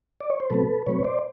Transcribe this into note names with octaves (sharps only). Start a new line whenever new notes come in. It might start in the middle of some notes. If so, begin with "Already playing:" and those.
D5
C#5
C5
B2 F#3 A3 C4 A4 B4
B2 F#3 A3 C4 B4 C#5
C5 D5